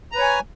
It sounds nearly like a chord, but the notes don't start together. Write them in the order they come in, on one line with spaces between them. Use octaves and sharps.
A#5 B4 C#5 G#5